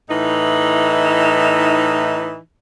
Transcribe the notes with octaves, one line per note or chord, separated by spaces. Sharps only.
A2 E3 D#4